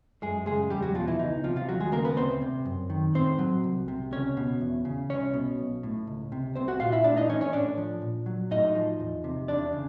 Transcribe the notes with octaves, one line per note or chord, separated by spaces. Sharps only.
F#2 G#3 G#4
C#3 G#3 G#4
E2 G3 G4
F#3 F#4
B2 F3 F4
E3 E4
C#2 D#4
C3 F3 F4
F3 F4
D#2 F#3 F#4
G#3 G#4
C#3 A#3 A#4
B3 B4
D2 C4 C5
C3
F#2
D#3
A2 C4 C5
F#3
C2
C3
C#2 C#4 C#5
B2
E2
C#3
C2 C#4 C#5
B2
B1
A2
C#2
C3
C2 C4 C5
F#4 F#5
A#2 F4 F5
E4 E5
A2 D4 D5
D#4 D#5
E3 C#4 C#5
C#4 C#5
A2 D4 D5
F3
A#2
F#3
A2 D#4 D#5
F3
E2
C3
E2 D4 D5
C#3